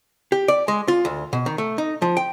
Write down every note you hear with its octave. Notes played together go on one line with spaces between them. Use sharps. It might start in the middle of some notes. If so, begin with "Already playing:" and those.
G4
D5
G#3
F4
D2
B2
D#3
A3
D#4
F3
G5